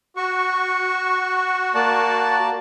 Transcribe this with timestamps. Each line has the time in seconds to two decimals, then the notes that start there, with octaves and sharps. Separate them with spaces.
0.16 F#4 C#6
1.75 A#3 D5 A5